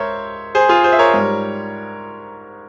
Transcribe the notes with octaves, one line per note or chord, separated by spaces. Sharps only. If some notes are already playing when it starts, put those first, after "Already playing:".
Already playing: C#2 A#4 C5 C#5 E5
G#4 C5
F4 G#4
G#4 C5
E5
A#4 C#5
G#2 G3